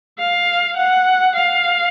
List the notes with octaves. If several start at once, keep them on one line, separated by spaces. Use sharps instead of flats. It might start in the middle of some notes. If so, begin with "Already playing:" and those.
F5
F#5
F5